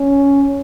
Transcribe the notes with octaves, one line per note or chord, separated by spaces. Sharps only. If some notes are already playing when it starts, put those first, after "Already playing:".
Already playing: C#4